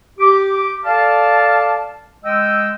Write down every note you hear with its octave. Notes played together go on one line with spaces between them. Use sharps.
G4 D6
A4 D5 F5 A5
G#3 D#5 G5 E6